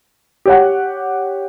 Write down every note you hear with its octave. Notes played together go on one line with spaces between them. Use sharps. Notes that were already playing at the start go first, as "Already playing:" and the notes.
G4 C#5 F#5